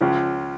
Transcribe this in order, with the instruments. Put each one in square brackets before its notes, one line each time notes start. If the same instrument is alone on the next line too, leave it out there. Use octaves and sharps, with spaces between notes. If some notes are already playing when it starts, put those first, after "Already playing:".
[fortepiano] C#2 C#3 F3